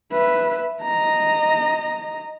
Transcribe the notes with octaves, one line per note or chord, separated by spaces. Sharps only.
B4 E5
D#5 A#5